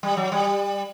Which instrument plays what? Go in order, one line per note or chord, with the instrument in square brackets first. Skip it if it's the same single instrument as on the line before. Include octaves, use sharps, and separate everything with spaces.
[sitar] G3
F#3
G3